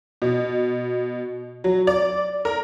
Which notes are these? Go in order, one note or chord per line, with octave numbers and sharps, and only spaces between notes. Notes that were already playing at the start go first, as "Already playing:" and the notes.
B2
F#3
D5
A#4